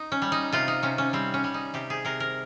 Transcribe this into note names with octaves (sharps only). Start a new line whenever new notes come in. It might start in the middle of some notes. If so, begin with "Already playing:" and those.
Already playing: D#4
C#4
G3
D#4
C3 F4
D#4
C3 C#4
C#4
G3 C4
C#4
G3
D#4
C3 G4
G#4
C3 A#4
A#4